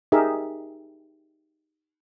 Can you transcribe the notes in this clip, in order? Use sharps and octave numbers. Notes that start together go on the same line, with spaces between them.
D#4 G4 G#4 A#4 E5